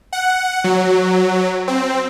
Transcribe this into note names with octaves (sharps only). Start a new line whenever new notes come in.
F#5
F#3
C4